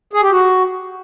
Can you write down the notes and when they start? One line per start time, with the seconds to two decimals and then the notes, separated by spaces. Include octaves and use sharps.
0.13 G#4
0.22 G4
0.31 F#4